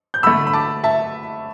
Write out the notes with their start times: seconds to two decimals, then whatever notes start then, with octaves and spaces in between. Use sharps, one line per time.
0.14 G6
0.23 D3 A3 B5 E6
0.47 B5
0.53 A5 D6
0.84 E5 A5